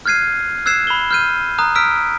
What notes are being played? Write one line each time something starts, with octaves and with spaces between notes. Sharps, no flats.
F6 F#6 G#6 C7 D#7
E6 F#6 G#6 C7 E7
B5 G7
F6 G6 D#7
A#5 D#6 F#6
E6 F6 B6 D7